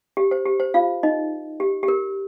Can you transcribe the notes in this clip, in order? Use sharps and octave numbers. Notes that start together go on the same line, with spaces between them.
G4
C5
G4
C5
F4 F5
D#4 D#5
G4
G4
A#4